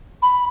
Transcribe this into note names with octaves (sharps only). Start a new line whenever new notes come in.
B5